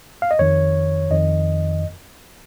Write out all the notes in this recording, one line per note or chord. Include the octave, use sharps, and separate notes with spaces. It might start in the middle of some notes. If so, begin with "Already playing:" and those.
F5
D#5
F2 D#3 C#5
F2 D#3 D#5